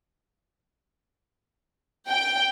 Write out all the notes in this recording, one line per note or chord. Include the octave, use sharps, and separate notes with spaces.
G5